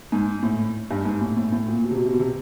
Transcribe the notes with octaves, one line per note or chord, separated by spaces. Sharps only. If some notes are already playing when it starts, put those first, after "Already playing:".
G#2
A2
G2
G#2
A2
A2
A2
A#2
B2
C3
B2
C3
B2
C3